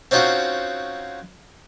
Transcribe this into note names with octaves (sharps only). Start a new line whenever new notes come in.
C4 C#4 D#4 F4 F#4